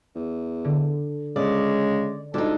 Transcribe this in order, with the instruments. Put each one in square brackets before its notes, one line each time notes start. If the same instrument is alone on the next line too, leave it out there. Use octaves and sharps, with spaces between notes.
[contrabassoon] E2
[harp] D3
[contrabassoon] C#3 [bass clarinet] G#3 [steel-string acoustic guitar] D5
[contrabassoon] D2 [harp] G#3 F4 G4 [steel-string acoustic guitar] D4 D#4 [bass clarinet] A4